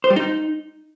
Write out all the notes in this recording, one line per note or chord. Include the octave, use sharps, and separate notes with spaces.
C5
G3
D#4